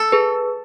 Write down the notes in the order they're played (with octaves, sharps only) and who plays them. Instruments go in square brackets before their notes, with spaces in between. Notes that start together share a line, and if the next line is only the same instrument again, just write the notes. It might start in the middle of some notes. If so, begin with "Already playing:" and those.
Already playing: [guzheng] A4
[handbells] G#4 B4